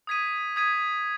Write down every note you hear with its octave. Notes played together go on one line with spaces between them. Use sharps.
D#6 G#6 B6 D#7
D#6 G#6 B6 D#7